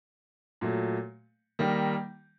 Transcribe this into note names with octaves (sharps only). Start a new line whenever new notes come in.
A#2 F#3 A3
D#3 G3 A#3